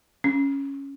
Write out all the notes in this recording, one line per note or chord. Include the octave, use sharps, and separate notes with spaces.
C#4